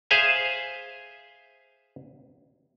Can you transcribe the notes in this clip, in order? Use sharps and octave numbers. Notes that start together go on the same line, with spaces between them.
G#4 C5 E5 F5 G#5